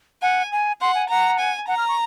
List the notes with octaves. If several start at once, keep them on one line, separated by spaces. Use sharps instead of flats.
F#5 G#5
G#5
F#5 C6
G#5
F#5 A#5
G#5
F#5 A#5
F6
C#6